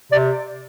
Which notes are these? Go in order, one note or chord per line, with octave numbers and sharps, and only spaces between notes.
C3 D5